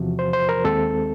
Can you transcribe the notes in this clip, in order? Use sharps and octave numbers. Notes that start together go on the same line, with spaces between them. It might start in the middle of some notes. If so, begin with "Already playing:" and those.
Already playing: E2 C3 F3 F#4
C5
C5
A#4
D#2 D#3 G#3 C4 A4